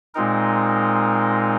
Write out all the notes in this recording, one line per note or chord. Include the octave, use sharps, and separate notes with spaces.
A#2 G#3 C4 D#4 A#4